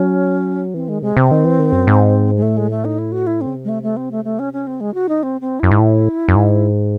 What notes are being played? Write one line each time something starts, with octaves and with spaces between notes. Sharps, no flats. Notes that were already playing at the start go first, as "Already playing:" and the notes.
Already playing: F#3 C#4
E3 C4
D#3 G#3
C3 G#3
C3 C4
D#3
E3
D#3
F#2
G#2
G#3
A2 A3
G#3
A3
D#4
E4
F#4
E4
C4
C#3
C3
G#3
A3
A3
C4
A3
A3
C#4
C#4
C#3 C4
G#3
F#4
D#4
C4
C4
F#2 E4
G#2
A2
F#2
G#2